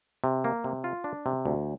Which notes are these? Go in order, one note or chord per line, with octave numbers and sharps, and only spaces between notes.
C3
A#3
C3
F4
D4
C3
D2